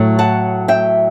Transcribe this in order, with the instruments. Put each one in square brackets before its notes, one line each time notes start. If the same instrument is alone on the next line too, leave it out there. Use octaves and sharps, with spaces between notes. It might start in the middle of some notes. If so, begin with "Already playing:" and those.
Already playing: [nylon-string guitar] A2 F#3 A3
F#5 A5
E5 G5